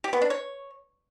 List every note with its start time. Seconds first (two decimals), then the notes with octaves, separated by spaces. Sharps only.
0.04 G4
0.13 B3
0.22 D4
0.30 C#5